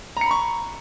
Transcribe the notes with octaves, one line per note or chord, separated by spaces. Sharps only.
A#5 B5 C#6 C#7